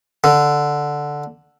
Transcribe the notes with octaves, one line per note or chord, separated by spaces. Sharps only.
D3